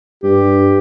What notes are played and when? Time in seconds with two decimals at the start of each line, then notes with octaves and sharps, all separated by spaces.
0.23 G2 G4